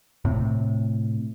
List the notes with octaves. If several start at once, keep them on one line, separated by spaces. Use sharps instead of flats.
A2 C3